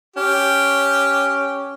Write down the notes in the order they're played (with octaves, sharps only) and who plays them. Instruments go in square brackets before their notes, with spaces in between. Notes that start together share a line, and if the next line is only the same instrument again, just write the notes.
[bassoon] C#4 [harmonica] G4